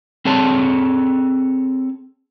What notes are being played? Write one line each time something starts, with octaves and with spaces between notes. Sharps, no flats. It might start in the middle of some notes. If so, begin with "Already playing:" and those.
C4 G#4 A4 C#5 A5